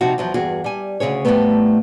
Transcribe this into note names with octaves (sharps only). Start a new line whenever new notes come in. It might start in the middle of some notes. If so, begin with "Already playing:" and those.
C3 F3 D#4 F#4
E2 F3 F#3
E2 G2 F#4 G#4
G3 G#5
D2 G2 C#3 G#4 C#5
F2 A2 D#3 G3 A3 B3